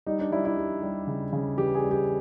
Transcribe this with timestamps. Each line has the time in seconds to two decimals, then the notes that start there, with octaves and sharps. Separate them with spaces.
0.06 G3 D#4
0.19 D4
0.32 G3 E4
0.45 E4
0.57 G3
0.83 G3
1.07 C#3
1.33 C#3
1.57 E3 G4
1.75 G#4
1.84 G3
1.91 G4